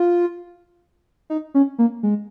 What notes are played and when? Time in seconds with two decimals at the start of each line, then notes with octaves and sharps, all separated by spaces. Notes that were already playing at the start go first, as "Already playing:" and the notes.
Already playing: F4
1.30 D#4
1.54 C#4
1.79 A#3
2.03 G#3